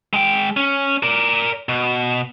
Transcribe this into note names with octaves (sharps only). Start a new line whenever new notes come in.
G#3 G5
C#4
A#4 D5
B2